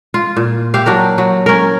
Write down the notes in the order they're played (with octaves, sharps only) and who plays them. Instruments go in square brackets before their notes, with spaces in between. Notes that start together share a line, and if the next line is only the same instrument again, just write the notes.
[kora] F4
A#2
G4 E5 F5
F#3 D4 A#4
F#3
C#4 A#4